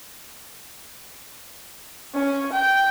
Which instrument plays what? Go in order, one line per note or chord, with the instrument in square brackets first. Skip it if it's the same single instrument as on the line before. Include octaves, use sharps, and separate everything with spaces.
[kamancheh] C#4
G5